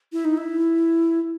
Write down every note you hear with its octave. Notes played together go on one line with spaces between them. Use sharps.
E4
D#4
E4